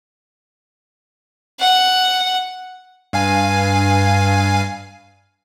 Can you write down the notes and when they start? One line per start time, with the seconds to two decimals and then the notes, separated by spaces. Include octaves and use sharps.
1.60 F#5
3.13 G2 F5 G#5